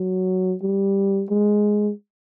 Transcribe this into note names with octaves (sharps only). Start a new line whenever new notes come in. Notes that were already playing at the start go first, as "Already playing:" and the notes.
Already playing: F#3
G3
G#3